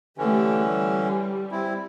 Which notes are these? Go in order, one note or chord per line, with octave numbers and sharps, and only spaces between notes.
D3 E3 A3 C#4 G4
G3
C4 E4